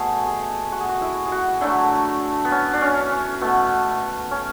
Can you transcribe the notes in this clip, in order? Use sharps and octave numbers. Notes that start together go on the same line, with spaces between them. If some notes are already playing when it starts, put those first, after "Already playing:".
Already playing: B2 A3 G#4
G#4
F#4
G#4
F#4
E4
G#4
F#4
D3 F#3 A3 E4
B3
C#4
D4
C#4
C#4
B2 A3 B3
C#4